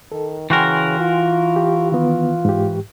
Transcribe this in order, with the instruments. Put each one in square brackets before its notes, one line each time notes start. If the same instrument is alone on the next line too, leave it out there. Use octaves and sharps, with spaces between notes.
[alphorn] D#3 [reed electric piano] A4
[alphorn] C#3 [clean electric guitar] E3 F#4 A#4 [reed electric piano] G5 G#5 C6
[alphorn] F4
[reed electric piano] G4
[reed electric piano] D#3 B3 [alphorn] F4
[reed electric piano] G#2 G4